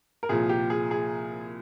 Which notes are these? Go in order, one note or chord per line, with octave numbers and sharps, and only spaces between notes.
A#4
C2 A#2 F3 G#4
G4
G#4
G#4